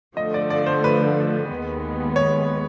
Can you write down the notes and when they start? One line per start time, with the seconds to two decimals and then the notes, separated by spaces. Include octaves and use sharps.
0.17 D3 F3 A3 D#5
0.34 D5
0.50 D5
0.66 C5
0.84 B4
1.50 D#2 D#3 G#3 B3
2.16 C#5